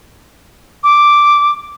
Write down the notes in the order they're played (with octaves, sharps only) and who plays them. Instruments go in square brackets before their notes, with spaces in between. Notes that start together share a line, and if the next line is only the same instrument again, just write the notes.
[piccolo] D6